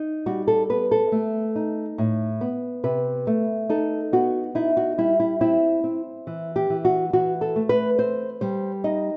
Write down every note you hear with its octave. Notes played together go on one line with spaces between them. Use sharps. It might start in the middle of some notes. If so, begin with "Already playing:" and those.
Already playing: D#4
G3 F#4
A4
B3 B4
A4
A3
D#4
A2
B3
C3 B4
A3
D#4 A4
B3 F#4
D#4 E4
F#4
G3 E4
E4
C4 E4
C4
E3
G4
E3
F#4
E3 F#4
A4
A3
B4
C4 C5
G3 C5
D#4 D#5